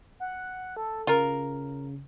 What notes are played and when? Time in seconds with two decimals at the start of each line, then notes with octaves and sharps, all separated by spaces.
0.20 F#5
0.77 A4
1.07 C#3 F4 A#4